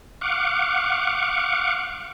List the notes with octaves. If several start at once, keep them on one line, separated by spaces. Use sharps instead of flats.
F5 F#5 C#6 D6